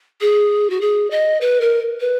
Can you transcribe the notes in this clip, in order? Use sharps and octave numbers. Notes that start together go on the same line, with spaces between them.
G#4
F#4
G#4
D#5
B4
A#4
B4